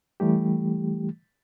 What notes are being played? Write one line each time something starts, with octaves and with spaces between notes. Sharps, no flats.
E3 G3 A3 G4